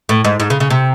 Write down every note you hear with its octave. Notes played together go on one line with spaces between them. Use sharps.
A2
G#2
G#2
C#3
C#3
C3